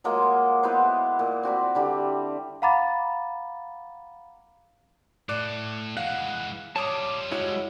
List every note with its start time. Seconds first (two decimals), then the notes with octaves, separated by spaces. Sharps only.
0.04 F#3 G#3 A#3 F4
0.63 B3 E4 B4 C5
1.19 A#2
1.43 C4 F#4 D5 B5
1.75 D3 G3 E4
2.62 F5 F#5 A#5 B5 D6 A6
5.29 A2 D5 D6 F#6
5.97 E3 G#3 F5 F#5 F#6
6.76 G3 F4 C#5 A5 D6 D#6
7.32 G#3 E4 F#4 C#5